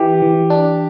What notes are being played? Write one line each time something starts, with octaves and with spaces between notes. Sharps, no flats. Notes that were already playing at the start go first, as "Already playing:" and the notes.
Already playing: E3 G4
E3
D4